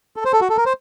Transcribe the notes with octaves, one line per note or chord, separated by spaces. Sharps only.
A4
C5
A4
F#4
A4
A#4
C5